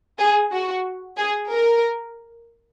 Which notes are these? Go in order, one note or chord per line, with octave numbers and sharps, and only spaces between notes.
G#4
F#4
G#4
A#4